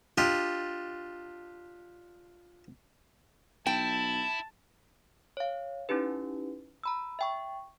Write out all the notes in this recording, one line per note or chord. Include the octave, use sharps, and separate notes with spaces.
D4 F4 G4 D5 D#5
B1 E4 G5 A5
C#5 F5
C#4 D#4 E4 G4 B4
A#5 B5 E6
E5 G5 C#6